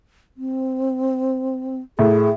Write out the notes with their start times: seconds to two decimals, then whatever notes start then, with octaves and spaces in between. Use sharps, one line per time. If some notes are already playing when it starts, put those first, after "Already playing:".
0.37 C4
1.99 A2 G#4